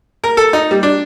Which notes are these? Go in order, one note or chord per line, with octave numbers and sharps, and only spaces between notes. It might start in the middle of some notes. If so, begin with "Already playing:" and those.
A#4
A4
D#4
G3
D4